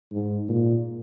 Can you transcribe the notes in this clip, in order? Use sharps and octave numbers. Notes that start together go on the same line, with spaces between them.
G#2
A#2